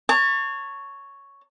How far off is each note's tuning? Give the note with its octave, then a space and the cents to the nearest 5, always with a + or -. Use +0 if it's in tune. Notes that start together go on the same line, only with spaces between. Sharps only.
C#5 +0 A5 +40